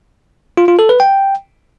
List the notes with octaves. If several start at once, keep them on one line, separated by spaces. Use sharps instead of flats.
F4
F4
A4
B4
G5